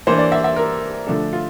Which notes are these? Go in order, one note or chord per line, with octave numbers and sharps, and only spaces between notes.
E3 A#3 D4 C5
D5
E5
E5
A#4
D3 F3 A3 D4 A4
F4